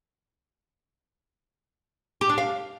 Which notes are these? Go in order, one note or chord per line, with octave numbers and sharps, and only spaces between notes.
G4
D4
F5